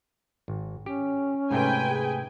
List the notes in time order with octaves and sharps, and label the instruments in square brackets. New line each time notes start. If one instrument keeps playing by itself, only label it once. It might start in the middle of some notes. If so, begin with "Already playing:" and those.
[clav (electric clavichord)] G#1
[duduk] C#4 [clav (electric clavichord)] G4
[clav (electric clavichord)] G#2 C3 A3 [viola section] B4 G5 G#5
[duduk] G#4